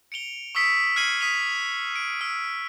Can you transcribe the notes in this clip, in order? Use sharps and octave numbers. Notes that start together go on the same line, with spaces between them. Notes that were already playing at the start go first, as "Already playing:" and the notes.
C#7 D7 F7 G7
C#6 D#6 E6 B6 C#7 D7
F6 G#6 C7 C#7 D#7 F#7
D#6 B6 D#7 F7 G7
D7
E6